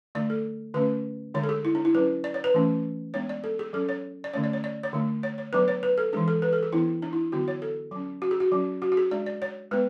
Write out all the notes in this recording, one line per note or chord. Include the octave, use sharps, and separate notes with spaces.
D3 A3 D4 D5
A4
D3 A3 C#4 B4
D3 G#3 D4 C#5
A4
G#4
E4
D4
E4
F#3 C#4 B4
D5
C#5
B4
E3 A3 C#4
G#3 B3 D4 C#5
D5
A4
G#4
F#3 C#4 A4
C#5
D5
D3 A3 C#4 C#5
D5
C#5
D5
C#5
D3 A3 D4
C#5
C#5
F#3 B3 D4 B4
C#5
B4
A4
E3 G#3 D4 G#4
A4
B4
A4
G#4
E3 B3 D4 E4
D4
E4
D3 F#3 B3 D4 F#4
C#5
A4
F#3 C#4
F#4
G#4
F#4
F#3 C#4
F#4
F#4
G#4
G#3 D4 D5
D5
C#5
G#3 B3 B4